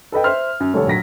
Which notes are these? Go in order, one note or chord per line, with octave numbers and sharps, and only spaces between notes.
A4 B4 D#5 G5
C5 E5 C6 F6
F#2
F1 D#2 G3 A4 C#5
A#1 F#3 A#6 B6